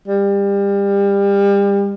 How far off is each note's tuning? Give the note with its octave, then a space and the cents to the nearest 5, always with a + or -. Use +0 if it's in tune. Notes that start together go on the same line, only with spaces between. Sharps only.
G3 +30